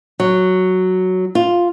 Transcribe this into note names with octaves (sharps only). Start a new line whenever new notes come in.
F#3
F4